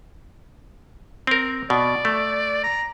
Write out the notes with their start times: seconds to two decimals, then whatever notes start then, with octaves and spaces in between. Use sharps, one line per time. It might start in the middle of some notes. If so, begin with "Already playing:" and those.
1.27 C4 A#4
1.70 B2 D5
2.05 A3
2.64 A#5